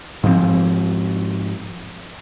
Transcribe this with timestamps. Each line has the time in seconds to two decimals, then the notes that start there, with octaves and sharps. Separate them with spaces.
0.24 G#2 F3 C4